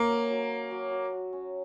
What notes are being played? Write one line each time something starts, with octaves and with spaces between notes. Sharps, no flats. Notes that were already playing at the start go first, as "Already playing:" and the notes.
Already playing: A#3 C#4
F#3
F#3
C#4
F#3
F#4
F#4
C#4